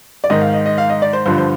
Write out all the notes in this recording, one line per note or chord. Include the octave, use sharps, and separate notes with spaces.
D5
G#2 D#3 D#5
F5
D#5
D#5
F5
D#5
D5
C5
G2 D3 F3 C5
C5